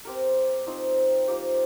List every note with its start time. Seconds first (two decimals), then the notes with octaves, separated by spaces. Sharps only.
0.05 C4 G4 A#4
0.67 F3 C4 D#4 C5
1.28 F3 A#3 G4